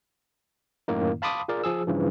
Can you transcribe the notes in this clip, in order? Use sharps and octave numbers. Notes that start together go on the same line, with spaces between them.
F#2 A2 D#3 A#3 D#4
F5 A5 B5 C6 D6 D#6
F4 G#4 A#4 D5
F3 G#4 E6
G2 C#3 E3 F3